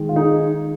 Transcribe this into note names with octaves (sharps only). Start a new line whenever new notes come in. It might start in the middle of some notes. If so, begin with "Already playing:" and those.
Already playing: D#3 G#3
F4
D#4 G#4